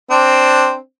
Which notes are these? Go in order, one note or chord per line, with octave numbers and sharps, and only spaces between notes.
C4 D4